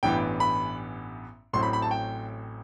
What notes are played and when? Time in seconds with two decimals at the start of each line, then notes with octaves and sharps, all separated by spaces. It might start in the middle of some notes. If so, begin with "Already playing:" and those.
0.03 A1 G2 E3 B3 G5
0.40 B5
1.53 A1 A2 F#3 C4 C6
1.63 B5
1.73 B5
1.82 A5
1.91 G5